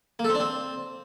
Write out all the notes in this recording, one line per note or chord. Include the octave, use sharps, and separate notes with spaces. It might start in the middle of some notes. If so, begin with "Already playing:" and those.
A#3
A4
C4
D4
C4